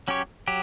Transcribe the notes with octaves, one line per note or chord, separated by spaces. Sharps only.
F#3 C#4 G4 C#5
F#3 G4